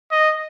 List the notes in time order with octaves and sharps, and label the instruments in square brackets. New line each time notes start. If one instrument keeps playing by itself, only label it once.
[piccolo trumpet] D#5